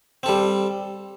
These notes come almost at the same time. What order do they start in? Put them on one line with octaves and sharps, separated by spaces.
C4 A4 G3